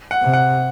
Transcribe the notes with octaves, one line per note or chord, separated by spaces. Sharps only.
F#5
C3
F#5